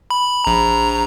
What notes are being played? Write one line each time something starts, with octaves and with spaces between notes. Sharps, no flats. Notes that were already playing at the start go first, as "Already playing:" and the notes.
B5
A#1 A#5